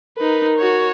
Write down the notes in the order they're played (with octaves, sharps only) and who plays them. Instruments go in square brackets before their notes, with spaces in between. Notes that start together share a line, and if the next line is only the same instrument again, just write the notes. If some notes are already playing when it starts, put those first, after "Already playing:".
[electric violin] D#4 B4 [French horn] A#4
[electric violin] F#4 C#5